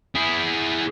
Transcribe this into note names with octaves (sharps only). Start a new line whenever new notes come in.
E4 G#4